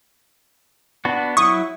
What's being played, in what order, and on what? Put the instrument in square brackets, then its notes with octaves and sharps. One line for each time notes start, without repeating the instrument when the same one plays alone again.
[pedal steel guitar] B3 D4 F#4
[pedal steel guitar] F#3 E4 [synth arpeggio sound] C#6 D#6